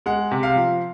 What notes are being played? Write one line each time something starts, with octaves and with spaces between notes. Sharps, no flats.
G#3 F#5
C3
F5
F3